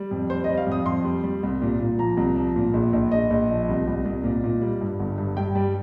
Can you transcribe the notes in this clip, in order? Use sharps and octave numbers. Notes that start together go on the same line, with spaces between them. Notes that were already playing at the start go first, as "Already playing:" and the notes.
Already playing: G3
F2
G3 C5
D#5
G3
F5
F2 D#6
F2 C6
G3
G3
C2
A#2
A#2
F3 A#5
C2
F3
A#2
A#1
A#1
A#1 D#5
A#1
F3
C2
C2
C2
A#2
A#2
G3
G2
G1
G2
G2 G5
G3